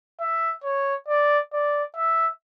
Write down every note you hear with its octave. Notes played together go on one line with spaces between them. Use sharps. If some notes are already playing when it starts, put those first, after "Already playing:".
E5
C#5
D5
D5
E5